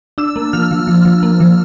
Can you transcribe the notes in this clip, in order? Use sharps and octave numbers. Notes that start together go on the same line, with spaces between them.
D4 E6
A#3
F3 F6
F3
F3
F3
A#3
F3